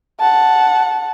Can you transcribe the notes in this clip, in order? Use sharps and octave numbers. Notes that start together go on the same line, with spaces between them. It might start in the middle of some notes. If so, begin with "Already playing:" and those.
F#5 A5